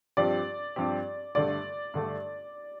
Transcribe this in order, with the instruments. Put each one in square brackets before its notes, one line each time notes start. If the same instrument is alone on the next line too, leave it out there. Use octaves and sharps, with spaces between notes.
[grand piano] G2 F3 C4 G4 [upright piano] D5
[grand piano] G2 F3 C4 G4
[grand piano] G2 D3 A3 [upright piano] D5
[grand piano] G2 D3 A3